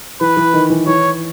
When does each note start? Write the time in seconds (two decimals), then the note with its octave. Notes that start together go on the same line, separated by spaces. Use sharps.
0.21 E3 B4
0.37 E3
0.54 D#3
0.70 E3
0.87 E3 C#5